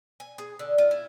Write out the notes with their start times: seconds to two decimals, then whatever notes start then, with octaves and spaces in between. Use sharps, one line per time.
0.20 G#5
0.38 G#4
0.59 D3
0.78 F4
0.91 E4